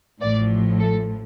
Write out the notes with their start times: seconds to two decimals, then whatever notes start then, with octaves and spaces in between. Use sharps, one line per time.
0.22 A1 A2 F3 D5
0.80 A4